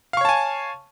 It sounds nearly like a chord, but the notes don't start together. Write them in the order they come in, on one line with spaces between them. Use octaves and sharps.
F5 C#6 C#5 A5 G#5